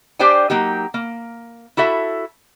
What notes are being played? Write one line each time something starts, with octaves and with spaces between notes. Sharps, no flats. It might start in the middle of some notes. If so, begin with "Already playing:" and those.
D4 G4 C5 D5 G5 G#5
F#3 A#3 D#4 G4
A#3
E4 F#4 A4 E5